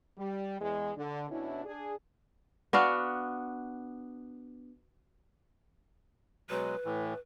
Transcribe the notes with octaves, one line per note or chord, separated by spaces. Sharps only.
G3
E2 G#3
D3
B2 C#4 D4 E4
D4 G#4
B3 D4 F#4 F5
B2 F#3 G#3 B4
A2 E3